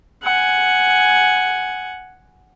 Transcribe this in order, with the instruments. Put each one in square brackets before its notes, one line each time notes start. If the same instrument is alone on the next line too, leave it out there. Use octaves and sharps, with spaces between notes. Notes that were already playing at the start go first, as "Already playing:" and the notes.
[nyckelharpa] F#5 G#5